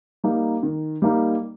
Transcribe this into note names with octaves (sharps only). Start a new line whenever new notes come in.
G3 A#3 D#4
D#3
G3 A#3 D#4